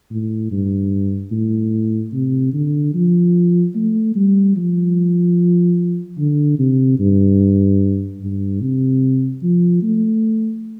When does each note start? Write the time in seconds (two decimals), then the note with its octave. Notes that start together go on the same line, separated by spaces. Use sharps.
0.10 A2
0.51 G2
1.32 A2
2.13 C3
2.54 D3
2.94 F3
3.75 A3
4.16 G3
4.57 F3
6.19 D3
6.59 C3
7.00 G2
8.21 G2
8.61 C3
9.43 F3
9.82 A3